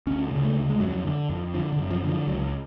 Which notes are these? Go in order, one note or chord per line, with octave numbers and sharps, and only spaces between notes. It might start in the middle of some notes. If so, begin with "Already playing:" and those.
D2 C#4
C#3
A3
D2
G#3
F2 F#3
D3
F2
D3 F3
D3
F#2
F3
D3
F3
C#2 F#3